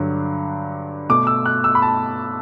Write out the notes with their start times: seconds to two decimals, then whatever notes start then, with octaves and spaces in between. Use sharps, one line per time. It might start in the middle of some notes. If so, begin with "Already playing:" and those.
Already playing: G2 D3 F#3
1.09 B2 A3 D6
1.27 E6
1.45 F#6
1.64 E6
1.75 B5
1.82 A5